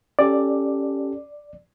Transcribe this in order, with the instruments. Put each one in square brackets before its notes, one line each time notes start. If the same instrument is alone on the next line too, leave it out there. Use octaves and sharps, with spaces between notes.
[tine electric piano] C#4 G4 A4 [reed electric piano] D5